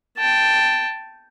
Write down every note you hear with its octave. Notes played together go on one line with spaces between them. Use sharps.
G5 A5